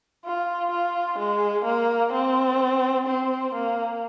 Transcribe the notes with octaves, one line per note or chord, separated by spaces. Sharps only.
F4
F4
G#3
A#3
C4
C4
A#3